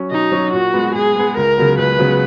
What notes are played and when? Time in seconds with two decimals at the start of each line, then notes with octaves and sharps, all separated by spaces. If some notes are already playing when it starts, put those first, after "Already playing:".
Already playing: F#3 C#4
0.11 B2 D#4
0.32 F#3 C#4
0.53 A#2 F#4
0.73 G#3 B3
0.95 A#2 G#4
1.15 G#3 B3
1.37 C#2 A#4
1.58 C#3 F#3 B3
1.78 C#2 B4
1.99 C#3 F#3 B3